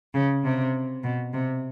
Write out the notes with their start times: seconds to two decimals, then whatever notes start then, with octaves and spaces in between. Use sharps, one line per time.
0.14 C#3
0.44 C3
1.03 B2
1.33 C3